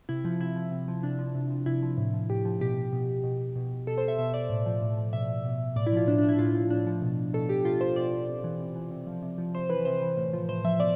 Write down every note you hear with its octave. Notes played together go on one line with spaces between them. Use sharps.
C3 E4
F3
C3 E4
F3
C3
F3
C3 D4
F3
C3
F3
C3 E4
F3
A2
F3
A2 G4
F3
B2 G4
B2
B2
B2
B2 A4
C5
E5
B2 E5
D5
A2
F3
A2
F3
B2 E5
B2
A2 D5
E4
F3 F4
A2 D4
D4
F3 E4
A2 F4
F3
A2 D4
F3
B2
B2 A4
G4
B2 F4
C5
B2 D5
C3
E3
C3
E3
C3
F3
C3
F3
C3 C5
E3 B4
C3 C5
E3
A2
F3
A2 C5
F3 E5
B2 D5